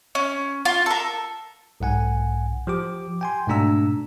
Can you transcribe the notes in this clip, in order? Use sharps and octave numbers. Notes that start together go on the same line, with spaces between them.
C#4
F4
A4 A#4
B1 G#2 F#5 G#5
F3 G4 D6
G5 G#5 C6
G#2 B2 A3 D4 A#5 E6